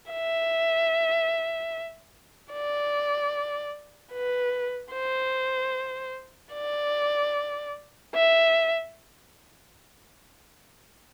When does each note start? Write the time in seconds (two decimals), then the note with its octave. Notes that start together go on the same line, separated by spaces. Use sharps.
0.12 E5
2.53 D5
4.13 B4
4.93 C5
6.54 D5
8.15 E5